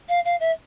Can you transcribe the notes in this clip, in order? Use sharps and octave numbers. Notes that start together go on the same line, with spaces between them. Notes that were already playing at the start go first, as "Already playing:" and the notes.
F5
F5
E5